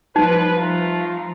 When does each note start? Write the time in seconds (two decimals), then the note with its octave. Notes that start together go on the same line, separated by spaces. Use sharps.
0.16 F3 G3 D#4 B4
0.57 F3 A3 F4 A#5